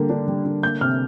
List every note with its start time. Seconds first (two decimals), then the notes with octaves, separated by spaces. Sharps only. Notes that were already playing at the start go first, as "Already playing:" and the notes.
Already playing: D3 G3 A#3
0.09 D4
0.28 G3
0.45 D3
0.63 A#3 G6
0.81 C3 F6